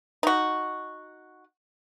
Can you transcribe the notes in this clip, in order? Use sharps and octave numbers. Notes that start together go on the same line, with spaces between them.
D#4 F#4